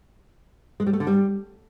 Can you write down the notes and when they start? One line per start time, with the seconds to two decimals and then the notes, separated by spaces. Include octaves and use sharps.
0.80 G#3
0.87 G3
0.93 A3
1.00 D3
1.07 G3